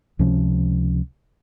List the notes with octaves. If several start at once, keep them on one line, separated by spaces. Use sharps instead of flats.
C#2 C3 F3 C#4